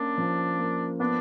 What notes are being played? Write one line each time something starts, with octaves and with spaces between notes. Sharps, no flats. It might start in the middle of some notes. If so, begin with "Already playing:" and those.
Already playing: A#3 C#4 D4
F3
A#3
B3 D4